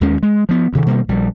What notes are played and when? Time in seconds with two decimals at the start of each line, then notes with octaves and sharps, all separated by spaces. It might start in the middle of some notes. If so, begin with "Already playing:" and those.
0.01 D#2 D#3 G#3 C#4
0.23 G#3
0.49 F3 B3
0.73 D2 C3 D#3
0.86 B2 D#3 G3 A#3
1.09 A#1 G3